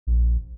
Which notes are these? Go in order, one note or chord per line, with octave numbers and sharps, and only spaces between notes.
A#1